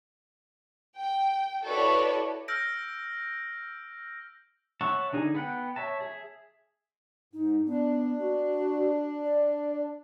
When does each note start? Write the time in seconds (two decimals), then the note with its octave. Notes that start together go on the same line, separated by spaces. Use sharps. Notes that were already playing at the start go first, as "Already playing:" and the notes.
0.98 G5
1.65 E4 F#4 A4 B4 C#5 D5
2.48 E6 F6 G6 A#6 D7
4.81 C#5 E5 F#5 A5 C#6
5.13 D3 D#4 G#4
5.35 B3 F#5 G5
5.76 C#5 E5 A5
6.01 G#4 E5
7.33 G#2 D#4
7.66 B3 D4
8.19 F#4
9.25 D5